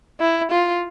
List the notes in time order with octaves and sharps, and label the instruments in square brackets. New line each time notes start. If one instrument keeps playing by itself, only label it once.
[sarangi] E4
F4